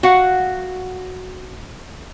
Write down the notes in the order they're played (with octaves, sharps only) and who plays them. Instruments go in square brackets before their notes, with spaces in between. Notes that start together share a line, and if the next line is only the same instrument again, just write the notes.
[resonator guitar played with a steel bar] F#4 F5 F#5